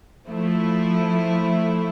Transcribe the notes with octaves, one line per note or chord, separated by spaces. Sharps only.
F3 A3 E4